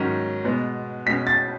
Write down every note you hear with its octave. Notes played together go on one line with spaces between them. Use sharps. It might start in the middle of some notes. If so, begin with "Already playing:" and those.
Already playing: G#2 D#3 F#3 C#4
B2 G#3 B3
B2 G#3 C#4 B6
A6